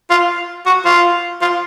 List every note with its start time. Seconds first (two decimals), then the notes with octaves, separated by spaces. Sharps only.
0.10 F4
0.66 F#4
0.85 F4
1.42 F4